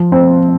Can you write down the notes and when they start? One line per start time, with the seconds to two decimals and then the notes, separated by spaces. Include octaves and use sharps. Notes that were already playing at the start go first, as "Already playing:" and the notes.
Already playing: F3
0.12 C4